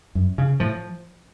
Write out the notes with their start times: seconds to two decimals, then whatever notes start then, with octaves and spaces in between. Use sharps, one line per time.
0.15 F#2
0.38 C#3
0.60 A2 F3